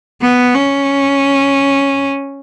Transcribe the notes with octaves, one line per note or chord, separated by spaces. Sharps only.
B3
C#4